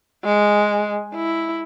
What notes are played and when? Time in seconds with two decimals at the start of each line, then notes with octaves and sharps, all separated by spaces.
0.24 G#3
1.15 E4